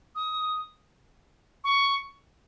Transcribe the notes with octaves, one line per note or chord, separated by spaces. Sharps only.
D#6
C#6